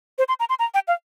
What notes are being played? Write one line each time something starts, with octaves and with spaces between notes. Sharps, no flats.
C5
C6
A#5
C6
A#5
G5
F5